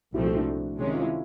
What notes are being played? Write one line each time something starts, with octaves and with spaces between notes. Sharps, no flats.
C2 A#2 F3 A3 C4 E4 F#4
E4 F#4
D4 E4
C3 D#3 G#3 C#4
F4
E4